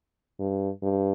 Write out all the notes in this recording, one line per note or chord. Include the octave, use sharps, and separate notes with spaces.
G2
G2